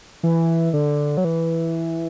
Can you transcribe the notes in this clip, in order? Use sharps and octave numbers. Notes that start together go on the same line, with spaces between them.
E3
D3
F#3
E3